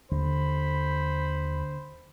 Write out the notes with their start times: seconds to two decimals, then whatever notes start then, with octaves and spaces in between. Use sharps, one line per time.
0.12 D#2 D3 C5 B5